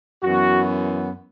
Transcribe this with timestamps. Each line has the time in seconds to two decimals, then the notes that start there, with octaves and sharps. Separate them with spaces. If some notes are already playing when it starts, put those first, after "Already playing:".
0.23 F#2 E3 B3 F#4